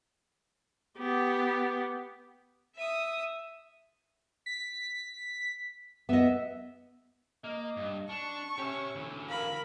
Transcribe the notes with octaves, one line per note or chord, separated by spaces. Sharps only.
B3 G4
E5 D#6
B6
B3 D#5 E5
A#3 D#5
G2
D4 A5 C#6
C#4 G4 E5
D2 E3
A#4 F5 B5